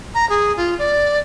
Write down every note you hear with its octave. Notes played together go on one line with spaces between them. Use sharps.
A#5
G#4
F4
D5